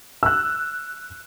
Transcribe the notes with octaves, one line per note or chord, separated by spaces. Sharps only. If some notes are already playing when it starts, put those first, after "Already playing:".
E6 F#6